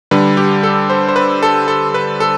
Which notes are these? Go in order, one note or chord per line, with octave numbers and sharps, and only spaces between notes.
D3 G3 B4
G4
A4
C5
C5
B4
A4
A4
B4
A4